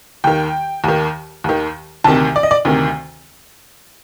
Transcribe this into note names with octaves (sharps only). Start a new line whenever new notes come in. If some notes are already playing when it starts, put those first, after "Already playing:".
D#2 D#3 G5
D#2 D#3
D#2 D#3
D2 C3 D#3 A5
D5
D#5
D5
D2 C3 D#3